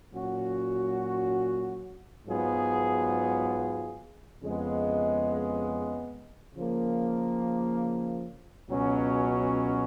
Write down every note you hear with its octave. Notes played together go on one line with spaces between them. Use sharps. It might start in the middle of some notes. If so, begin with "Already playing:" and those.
A#2 F#3 C#4 F#4
G#2 F#3 B3 F4 G#4
F2 C#3 G#3 B3
C#3 F3 A#3
C#2 B2 F#3 C#4